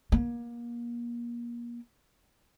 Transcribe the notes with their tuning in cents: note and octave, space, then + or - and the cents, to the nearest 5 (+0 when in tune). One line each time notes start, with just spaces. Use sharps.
A#3 +30